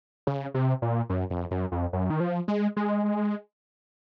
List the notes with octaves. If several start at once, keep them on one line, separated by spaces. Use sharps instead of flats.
C#3
C3
A#2
F#2
F2
F#2
F2
F#2
D#3
F3
G#3
G#3